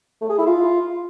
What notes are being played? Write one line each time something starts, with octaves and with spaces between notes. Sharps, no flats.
A3
G#4
E4
F4